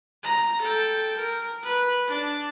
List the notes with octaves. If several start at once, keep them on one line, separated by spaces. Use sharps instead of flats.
A#5
A4 G5
A#4
B4
D4